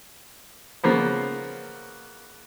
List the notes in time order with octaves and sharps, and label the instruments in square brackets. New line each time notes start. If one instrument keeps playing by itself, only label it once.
[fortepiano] C#3 F3 A#3 B3